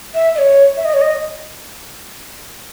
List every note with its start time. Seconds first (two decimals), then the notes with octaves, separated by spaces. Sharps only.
0.15 E5
0.35 D#5
0.38 C#5
0.77 E5
0.85 D#5
0.94 C#5
1.02 D#5